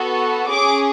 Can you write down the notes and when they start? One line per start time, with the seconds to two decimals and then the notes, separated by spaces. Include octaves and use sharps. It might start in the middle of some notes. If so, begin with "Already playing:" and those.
Already playing: B3 F#4 A4
0.49 C#4 G#4 D6